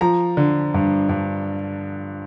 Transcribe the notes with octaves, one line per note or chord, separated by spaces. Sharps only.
F3 A#5
D3
G2
G2